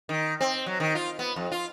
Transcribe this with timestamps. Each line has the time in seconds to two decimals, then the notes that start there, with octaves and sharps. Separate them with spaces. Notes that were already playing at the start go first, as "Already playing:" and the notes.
0.09 D#3
0.41 C4
0.66 F#3
0.80 D#3
0.95 F4
1.19 B3
1.36 F2
1.52 F4